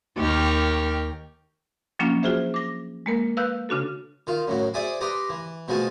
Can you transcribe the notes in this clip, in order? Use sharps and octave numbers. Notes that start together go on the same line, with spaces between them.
D#2 G4 A#4 G5 C#6 F6
F3 F#3 A#3 C#4 D4 F4
F4 F#4 G#4 C5 E5
D6 A#6
G#3 A#3 A#4
B4 F5 E6 F#6 G6
C#3 D4 F#4 A4
D#3 F4
F#2 A2 F#3
G#4 C5 D5 E5 G#5
G4 B4 D#5 A#5 C6 D6
E3
B2 F3 G#3 A3 G#5 A5